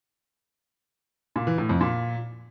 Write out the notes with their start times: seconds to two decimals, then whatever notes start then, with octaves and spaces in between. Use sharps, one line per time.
1.36 A#2
1.47 E3
1.58 A2
1.69 F2
1.81 A#2